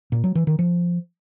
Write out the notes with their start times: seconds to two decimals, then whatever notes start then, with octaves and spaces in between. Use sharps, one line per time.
0.12 A#2
0.24 F#3
0.35 E3
0.47 D#3
0.59 F3